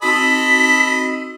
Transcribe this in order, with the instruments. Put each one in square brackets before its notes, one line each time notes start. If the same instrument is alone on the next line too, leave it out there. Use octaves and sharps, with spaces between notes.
[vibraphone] C4 D#4 F#4 [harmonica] A4 D#5 B5 [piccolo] B6